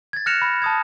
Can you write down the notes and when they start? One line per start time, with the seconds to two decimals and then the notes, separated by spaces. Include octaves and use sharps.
0.13 G#6 A6
0.26 F6 F#6 A#6 C#7 E7 F7
0.42 B5
0.62 A5 D#6 G#6